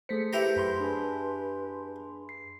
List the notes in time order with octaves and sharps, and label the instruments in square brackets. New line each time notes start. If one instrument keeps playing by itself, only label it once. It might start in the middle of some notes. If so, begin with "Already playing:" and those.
[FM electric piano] A3 B6 C#7 [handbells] G#4 A4 C5
[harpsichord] E4 G4 A#5 [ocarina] B4
[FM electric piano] F#2 B5 C6
[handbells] D4 G#4 G#5
C7